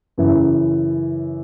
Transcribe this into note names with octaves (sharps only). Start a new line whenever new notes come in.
F#2 C#3 E3